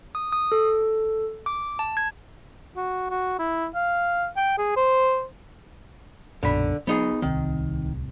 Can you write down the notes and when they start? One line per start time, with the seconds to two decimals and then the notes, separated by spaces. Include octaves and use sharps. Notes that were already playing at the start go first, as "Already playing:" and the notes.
0.15 D#6
0.33 D#6
0.52 A4
1.46 D6
1.79 A5
1.97 G#6
2.77 F#4
3.10 F#4
3.39 E4
3.75 F5
4.37 G5
4.58 G#4
4.76 C5
6.43 B1 F#2 A#2 D3 B5
6.87 F#3 B3 D#4 G#4
7.22 D1 C2 D#3 C4